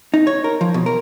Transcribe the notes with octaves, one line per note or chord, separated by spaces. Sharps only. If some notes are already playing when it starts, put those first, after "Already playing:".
D#4
C#5
A#4
F3
B2
A#4